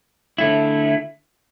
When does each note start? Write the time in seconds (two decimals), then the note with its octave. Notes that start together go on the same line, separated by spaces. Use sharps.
0.38 D3 A3 E4